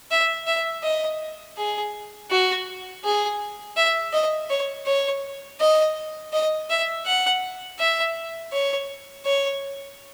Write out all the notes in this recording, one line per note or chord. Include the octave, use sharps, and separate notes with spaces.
E5
E5
D#5
G#4
F#4
G#4
E5
D#5
C#5
C#5
D#5
D#5
E5
F#5
E5
C#5
C#5